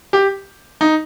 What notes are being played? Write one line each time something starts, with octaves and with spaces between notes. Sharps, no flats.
G4
D#4